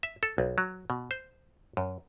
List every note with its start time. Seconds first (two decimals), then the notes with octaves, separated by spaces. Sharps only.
0.03 E5
0.23 A4
0.38 B1
0.58 F#3
0.90 B2
1.11 C5
1.77 F#2